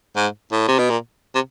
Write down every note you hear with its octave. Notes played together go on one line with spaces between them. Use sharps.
G#2
A2
C3
B2
A#2
C3